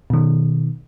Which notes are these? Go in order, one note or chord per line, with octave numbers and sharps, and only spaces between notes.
B2 D#3